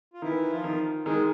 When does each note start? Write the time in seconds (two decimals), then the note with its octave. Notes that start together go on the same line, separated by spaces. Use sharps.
0.14 F4
0.22 D#3 E3 E4
0.50 F3 F4
0.64 D#3
1.06 D#3 G#3 G#4